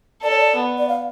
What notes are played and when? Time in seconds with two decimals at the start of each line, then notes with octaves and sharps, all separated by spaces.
0.23 A4 D5
0.31 C#5
0.39 D5
0.56 B3
0.78 D5
0.89 F5